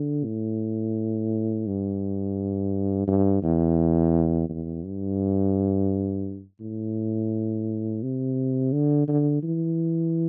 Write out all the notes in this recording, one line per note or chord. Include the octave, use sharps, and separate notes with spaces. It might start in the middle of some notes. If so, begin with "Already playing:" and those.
Already playing: D3
A2
G2
G2
E2
E2
G2
A2
C3
D3
D3
E3